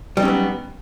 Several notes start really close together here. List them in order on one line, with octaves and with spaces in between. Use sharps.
G3 D#4 C#4 F#3 B3